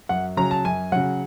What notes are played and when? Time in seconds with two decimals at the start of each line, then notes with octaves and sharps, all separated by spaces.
0.09 F#2 F#5
0.37 C#3 F#3 A#5
0.51 A5
0.65 F#2 G#5
0.92 C#3 F#3 F#5